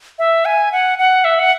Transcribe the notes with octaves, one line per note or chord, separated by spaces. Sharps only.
E5
G#5
F#5
F#5
E5
F#5